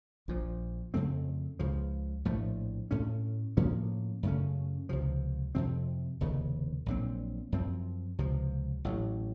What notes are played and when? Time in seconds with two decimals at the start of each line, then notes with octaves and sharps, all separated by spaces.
0.28 A#1 A#2 F3
0.94 F2 C#3 A3 C4
1.59 C#2 C#3 F3
2.25 A#1 A2 F3 A3
2.91 A2 A3 C#4
3.57 A2 F3 A#3 C#4
4.23 F#2 C#3 A3 C#4
4.89 C#2 C3 F3
5.55 F2 C3 F3 C4
6.21 F1 D#2 C#3
6.86 A#1 A#2 F#3 C4
7.52 F#2 F3 C4
8.19 C#2 C3 F3
8.85 A1 A2 F#3